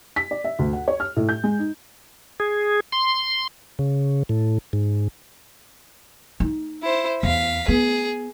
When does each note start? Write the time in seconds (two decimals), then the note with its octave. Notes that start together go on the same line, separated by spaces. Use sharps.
0.16 B6
0.31 D5
0.44 E5
0.59 D2
0.73 F#5
0.88 C#5
1.00 F6
1.16 A2
1.29 G6
1.43 G#3
1.59 D#4
2.40 G#4
2.92 C6
3.79 C#3
4.29 A2
4.73 G#2
6.40 D#4
6.83 E4 C5
7.23 E2 F5 B6
7.68 B3 G#4